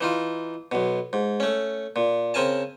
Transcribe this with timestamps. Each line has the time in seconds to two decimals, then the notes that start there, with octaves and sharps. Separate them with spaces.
0.01 E3 D#4 F4
0.72 B1 B2
1.13 G#2
1.40 A3 C#4
1.96 A#2
2.34 C#3 C4 A#4 G#5 A5